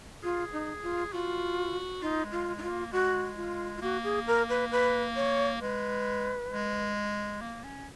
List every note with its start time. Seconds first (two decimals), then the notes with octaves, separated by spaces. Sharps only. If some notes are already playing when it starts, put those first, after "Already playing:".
0.23 F4 G#4
0.52 D#4
0.83 F4
1.12 F4 F#4
2.02 D#4 F4
2.24 G#3
2.32 F4
2.47 G#3
2.58 D#4
2.63 F4
2.69 A#3
2.92 G#3 F#4
3.36 F4
3.78 F4
3.82 A#3 F#4
4.04 G#4
4.27 A#4
4.49 B4
4.71 B4
5.16 C#5
5.61 G#3 B4
6.51 G#3
7.41 A#3
7.64 C#4